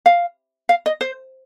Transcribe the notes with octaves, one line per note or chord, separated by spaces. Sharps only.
F5
F5
D#5
C5